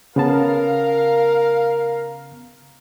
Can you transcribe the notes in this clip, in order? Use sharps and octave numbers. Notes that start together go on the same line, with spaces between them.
C#3 B3 A#4 F5 A5